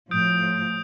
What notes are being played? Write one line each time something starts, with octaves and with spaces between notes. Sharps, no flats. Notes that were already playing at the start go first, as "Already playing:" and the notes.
A2 F3 D#6 G6 D7